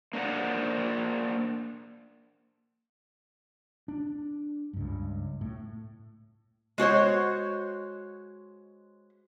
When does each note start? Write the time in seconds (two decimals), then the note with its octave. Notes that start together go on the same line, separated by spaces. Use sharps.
0.13 A#3 D4 C5 F#5
3.88 D4
4.73 C#2 G2
5.41 A2
6.78 G#3 F#4 C5 C#5